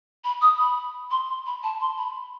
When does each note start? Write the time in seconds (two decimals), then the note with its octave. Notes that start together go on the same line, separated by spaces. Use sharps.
0.24 B5
0.41 D#6
0.58 B5
1.11 C6
1.29 C6
1.46 B5
1.63 A5
1.80 C6
1.98 B5